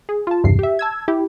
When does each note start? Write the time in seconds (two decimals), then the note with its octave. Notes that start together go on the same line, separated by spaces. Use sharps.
0.09 G#4
0.27 F4 A5
0.44 B1 E2 G2 C3 C7
0.59 G4 E5
0.79 A5 E6 G#6
1.08 E4 G4